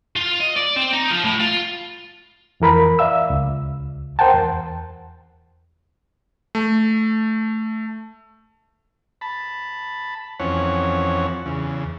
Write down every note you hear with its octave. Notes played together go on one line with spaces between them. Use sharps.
F4
D#5
D5
C4
D#4
F3
A2
F4
F2 E3 A#4 B5
D5 E5 F5 E6
C#2
A#4 C5 F#5 G5 A5
E2
A3
A5 B5
F2 E3 C4 C#4 C#5 F#5
E2 C#3